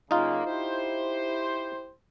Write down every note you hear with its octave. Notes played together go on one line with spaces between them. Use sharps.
F#2 C#3 A#3 D#4 F4
E4 G4 C5